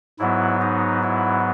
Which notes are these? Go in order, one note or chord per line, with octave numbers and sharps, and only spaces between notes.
G#2 F#3 B3 E4
D#4
E4